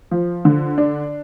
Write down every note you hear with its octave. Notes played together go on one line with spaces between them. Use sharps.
F3
D3
D4